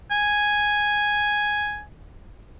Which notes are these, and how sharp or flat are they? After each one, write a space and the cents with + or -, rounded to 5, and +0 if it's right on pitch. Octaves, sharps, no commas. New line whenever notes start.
G#5 +0